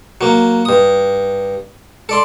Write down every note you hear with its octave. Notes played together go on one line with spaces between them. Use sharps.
F#3 A#3
G2 D#6
A4 D5 C6